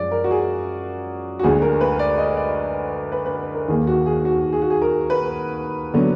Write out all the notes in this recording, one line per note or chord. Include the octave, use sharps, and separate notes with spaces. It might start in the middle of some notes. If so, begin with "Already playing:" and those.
Already playing: F#2 F3 G#3 D5
A#4
F#4
G#4
F#4
D2 D3 G#3 G#4
A#4
B4
D5
D#5
D5
B4
B4
A#4
D#2 D#3 A#3 G#4
F#4
G#4
F#4
G#4
F#4
G#4
A#4
B4
D3 F#3 B3